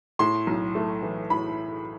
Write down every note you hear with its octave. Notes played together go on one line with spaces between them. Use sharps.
A2 C6
B1
A3
E3
A2 B5